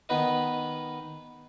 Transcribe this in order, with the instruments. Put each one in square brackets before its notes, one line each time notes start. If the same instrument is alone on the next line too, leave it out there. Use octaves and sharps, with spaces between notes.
[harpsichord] D#3 B3 B4 D#5